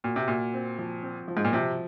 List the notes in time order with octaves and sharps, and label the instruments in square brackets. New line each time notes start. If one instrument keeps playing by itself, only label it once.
[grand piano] A#2 [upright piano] F#4
[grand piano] C3
[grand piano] A#2 [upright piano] F#4
[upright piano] C4
F3
C4
F3
[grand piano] G#2
A#2
[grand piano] C3 [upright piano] F3